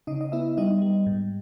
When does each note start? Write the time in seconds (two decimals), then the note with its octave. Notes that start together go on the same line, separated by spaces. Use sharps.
0.07 C#3 D#4 D#5
0.21 D#5
0.32 B3 E4 E5
0.57 G3 D#4 D#5
0.82 G3
1.06 G#2